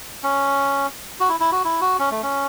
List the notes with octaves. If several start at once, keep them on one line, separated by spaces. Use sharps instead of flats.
C#4
F#4
E4
E4
F#4
E4
F#4
C#4
A3
C#4